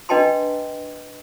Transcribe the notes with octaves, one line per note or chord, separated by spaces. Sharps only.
D4 B4 D#5 G5 A5 C6